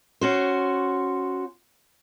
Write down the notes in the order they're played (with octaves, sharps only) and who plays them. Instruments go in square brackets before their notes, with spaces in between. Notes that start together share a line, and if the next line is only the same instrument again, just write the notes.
[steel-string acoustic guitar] C#4 F#4 C5